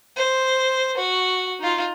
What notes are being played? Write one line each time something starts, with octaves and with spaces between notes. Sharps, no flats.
C5
F#4
D#4 F4